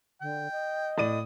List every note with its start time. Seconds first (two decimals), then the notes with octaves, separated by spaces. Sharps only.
0.21 D3 G5
0.51 D#5
0.98 A2 D5 D#6 D#7